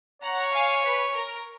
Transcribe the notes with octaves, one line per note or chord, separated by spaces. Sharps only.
C#5 F#5 A#5
F5 G#5
B4
A#4